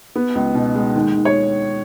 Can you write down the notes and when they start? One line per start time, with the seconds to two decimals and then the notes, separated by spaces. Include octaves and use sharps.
0.15 B3
0.35 C#2
0.55 B2
0.75 G#3
0.95 D#2
1.15 D#2
1.25 C#5